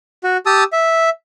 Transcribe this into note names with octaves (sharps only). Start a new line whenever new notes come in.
F#4
G4 A5 D#6 E6
E5